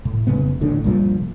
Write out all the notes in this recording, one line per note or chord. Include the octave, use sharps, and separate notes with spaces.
A2
F1 D#2 C#3 B3
A1 A2 D3
C2 G2 A#2 F3